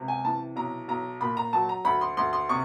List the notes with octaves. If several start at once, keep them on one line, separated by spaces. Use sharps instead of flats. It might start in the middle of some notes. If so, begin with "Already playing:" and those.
Already playing: C#2 C3
G#5
E3 A5
B1 A#5
B1 A#5
A#2 B5
A#5
F#3 A5
A#5
D2 B5
C6
D2 C6
C6
C3 C#6